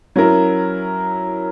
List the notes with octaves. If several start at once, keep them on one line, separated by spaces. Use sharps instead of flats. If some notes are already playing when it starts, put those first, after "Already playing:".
F#3 C#4 E4 A#4